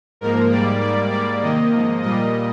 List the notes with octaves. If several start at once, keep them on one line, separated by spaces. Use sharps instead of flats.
G#2 F3 A#3 A#4
G#2 G3 A#3 D5
G#2 G3 A#3 D5
G#2 G3 A#3 D5
C3 D#3 A#3 D#5
G#2 F3 A#3
A#2 G3 A#3 D#5